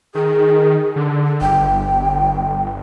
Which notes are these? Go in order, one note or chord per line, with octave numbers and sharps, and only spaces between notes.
D#3 G#4
D3
G1 G5